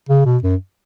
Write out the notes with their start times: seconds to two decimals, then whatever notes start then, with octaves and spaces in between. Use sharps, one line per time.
0.09 C#3
0.25 B2
0.43 F#2